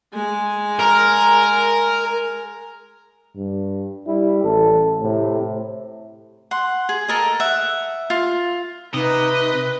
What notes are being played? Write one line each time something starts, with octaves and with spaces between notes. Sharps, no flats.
G#3 G#5
A#4
G2
G3 E4
A1 A4
A2 C3
F#5 C6
G#4
A4 A#4 D#5
E5 F#5
F4
C3 D#4 B4 D#5